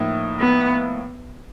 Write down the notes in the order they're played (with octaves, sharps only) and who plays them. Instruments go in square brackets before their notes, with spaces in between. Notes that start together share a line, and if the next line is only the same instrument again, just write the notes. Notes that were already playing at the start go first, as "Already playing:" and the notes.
Already playing: [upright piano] A2 F3 A#3 D#4
[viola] B3